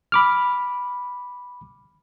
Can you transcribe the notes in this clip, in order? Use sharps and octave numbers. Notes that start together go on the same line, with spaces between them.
B5 D6 F6